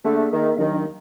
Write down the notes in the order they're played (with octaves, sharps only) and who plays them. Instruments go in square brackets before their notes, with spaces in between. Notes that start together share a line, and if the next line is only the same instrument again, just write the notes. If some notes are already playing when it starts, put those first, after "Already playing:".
[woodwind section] D3 A3 [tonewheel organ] A#3 G#4 E5
[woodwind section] D#3
[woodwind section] D#2 D#3 [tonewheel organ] F#3 D4 D#5